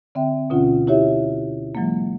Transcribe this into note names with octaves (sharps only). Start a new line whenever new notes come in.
D3 C4 E5 G5
D2 B2 D3 C#4 F4 F#5
E4 F#4 G4 C#5 E5
E3 F#3 G#3 A#3